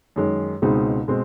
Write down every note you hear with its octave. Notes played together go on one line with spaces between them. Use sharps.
F#2 D#3 G#3
C#2 B2 G#3 C4 D#4
B2 G#3 C4